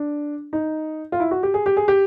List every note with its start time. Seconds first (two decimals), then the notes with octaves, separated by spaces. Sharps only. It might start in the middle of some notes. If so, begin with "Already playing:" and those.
Already playing: D4
0.53 D#4
1.12 F4
1.20 E4
1.31 F#4
1.43 G4
1.54 G#4
1.66 G4
1.77 G#4
1.88 G4